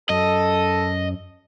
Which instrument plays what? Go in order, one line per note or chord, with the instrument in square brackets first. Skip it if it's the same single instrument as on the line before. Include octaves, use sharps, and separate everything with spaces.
[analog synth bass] F#2 [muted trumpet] A4 [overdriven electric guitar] D#5